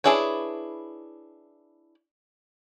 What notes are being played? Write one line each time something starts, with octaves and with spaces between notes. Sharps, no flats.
D4 E4 G#4 B4 C#5